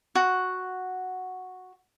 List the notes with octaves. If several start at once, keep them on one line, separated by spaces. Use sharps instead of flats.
F#4